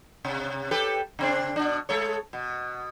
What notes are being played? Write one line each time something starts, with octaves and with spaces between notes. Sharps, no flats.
C3
G4 A4 B4
C#3 C4 D4
B2 D4
G#3 A4 C#5
B2